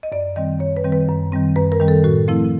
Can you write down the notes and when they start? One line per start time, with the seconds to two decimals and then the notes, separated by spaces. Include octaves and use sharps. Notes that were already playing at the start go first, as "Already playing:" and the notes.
0.03 D#5
0.12 F#2 D5
0.36 D#3 G3 C4 D#5
0.60 F#2 C#5
0.77 B4
0.84 D#3 G3 C4
0.92 B4
1.09 F#2
1.32 D#3 G3 C4
1.56 F#2 B4
1.72 A#4
1.80 D#3 G3 C4
1.88 A4
2.04 A2 F#4
2.28 F3 A3 C4 E4